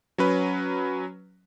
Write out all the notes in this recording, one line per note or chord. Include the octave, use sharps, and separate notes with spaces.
F#3 C#4 B4